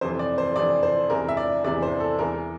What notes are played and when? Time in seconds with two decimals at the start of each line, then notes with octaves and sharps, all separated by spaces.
0.01 F2 C3 E3 C5
0.19 D5
0.38 C5
0.56 F2 C3 E3 D5
0.83 C5
1.10 E2 C3 E3 A#4
1.29 E5
1.37 D5
1.64 E2 C3 E3 D5
1.83 C5
2.00 A4
2.19 E2 E3 A#4